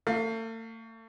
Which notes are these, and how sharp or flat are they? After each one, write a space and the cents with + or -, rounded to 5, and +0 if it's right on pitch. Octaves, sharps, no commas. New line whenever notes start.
A3 +40 F5 +15